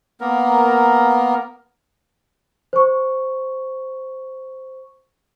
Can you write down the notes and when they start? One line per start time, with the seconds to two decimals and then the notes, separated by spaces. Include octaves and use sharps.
0.21 A#3 B3 A#4
2.73 C5 C#6